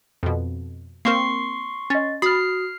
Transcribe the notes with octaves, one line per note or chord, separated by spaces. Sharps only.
F2 B2
A#3 C4 A#4 C6 C#6 C7
C#4 D#5 A6
F#4 B5 D#6 F6 A6 C7